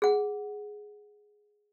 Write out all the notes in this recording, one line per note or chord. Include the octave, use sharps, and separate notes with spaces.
G#4 F#5